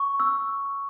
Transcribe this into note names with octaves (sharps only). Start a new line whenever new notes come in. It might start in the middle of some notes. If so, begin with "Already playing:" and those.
Already playing: C#6
E6